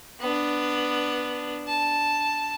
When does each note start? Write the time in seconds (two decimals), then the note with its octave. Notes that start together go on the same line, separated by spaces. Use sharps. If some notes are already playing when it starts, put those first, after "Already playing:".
0.20 B3 D4
1.68 A5